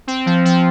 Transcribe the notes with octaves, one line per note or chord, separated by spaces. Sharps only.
C4
F3
F3